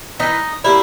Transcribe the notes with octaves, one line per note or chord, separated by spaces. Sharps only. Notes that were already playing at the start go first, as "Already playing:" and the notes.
E3 D#4
G3 A#3 E4